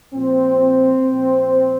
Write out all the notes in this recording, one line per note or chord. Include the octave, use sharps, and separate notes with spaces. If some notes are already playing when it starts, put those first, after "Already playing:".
A#2 F3 C4
A#2 F3